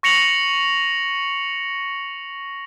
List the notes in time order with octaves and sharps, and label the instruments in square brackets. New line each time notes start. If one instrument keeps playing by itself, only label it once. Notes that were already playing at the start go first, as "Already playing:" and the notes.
[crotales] C#6 A#6 C#7 F7 F#7